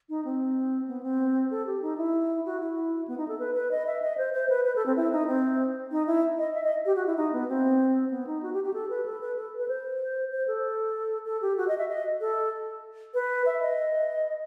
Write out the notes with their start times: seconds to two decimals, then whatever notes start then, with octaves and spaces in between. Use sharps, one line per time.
0.09 D#4
0.25 C4
0.88 B3
1.03 C4
1.51 A4
1.67 G4
1.82 D#4
1.98 E4
2.46 F#4
2.60 E4
3.08 B3
3.18 D#4
3.28 A4
3.39 B4
3.55 B4
3.71 D#5
3.87 E5
4.02 D#5
4.18 C5
4.33 C5
4.50 B4
4.65 B4
4.76 A4
4.86 C4
4.96 E4
5.12 D#4
5.28 C4
5.91 D#4
6.07 E4
6.39 D#5
6.54 E5
6.64 D#5
6.86 G4
6.96 F#4
7.07 E4
7.17 D#4
7.33 B3
7.48 C4
8.11 B3
8.27 D#4
8.43 F#4
8.53 G4
8.64 G4
8.74 A4
8.90 B4
9.06 A4
9.21 B4
9.36 A4
9.58 B4
9.68 C5
10.32 C5
10.47 A4
11.26 A4
11.42 G4
11.57 F#4
11.68 D#5
11.78 E5
11.89 D#5
12.21 A4
13.14 B4
13.46 E5
13.62 D#5